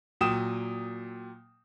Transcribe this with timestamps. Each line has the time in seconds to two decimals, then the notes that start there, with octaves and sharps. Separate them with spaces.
0.21 A#2 F#3 G5 D#6 E7